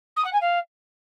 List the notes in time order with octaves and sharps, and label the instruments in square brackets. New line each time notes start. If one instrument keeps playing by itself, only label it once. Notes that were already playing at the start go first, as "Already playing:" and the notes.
[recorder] D#6
F#5
G#5
F5